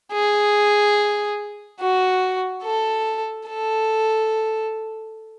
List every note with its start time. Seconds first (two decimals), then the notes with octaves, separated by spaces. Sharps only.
0.13 G#4
1.80 F#4
2.63 A4
3.47 A4